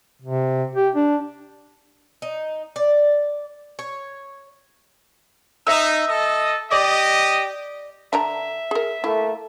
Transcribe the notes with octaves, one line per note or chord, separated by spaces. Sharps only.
C3
G4
D4
D#4
D5
C#5
D#4 E5 E6
A4 D#5
G4 D5 D#5
D3 D4 E5 A#5
G#4 A#4
A3 A#3 E4